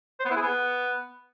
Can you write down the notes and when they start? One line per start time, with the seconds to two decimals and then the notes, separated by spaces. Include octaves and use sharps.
0.20 C5
0.25 B3
0.31 E4
0.36 G#4
0.42 B3